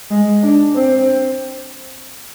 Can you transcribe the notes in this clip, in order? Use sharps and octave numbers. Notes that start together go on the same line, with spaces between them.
G#3
D4
C4